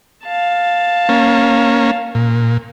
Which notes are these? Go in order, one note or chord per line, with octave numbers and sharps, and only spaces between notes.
F5 A5
A#3 C#4
A#2